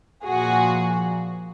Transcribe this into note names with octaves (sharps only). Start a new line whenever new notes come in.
A#2 F3 F#4 G#4